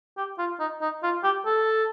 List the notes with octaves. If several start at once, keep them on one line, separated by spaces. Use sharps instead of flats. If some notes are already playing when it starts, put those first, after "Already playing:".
G4
F4
D#4
D#4
F4
G4
A4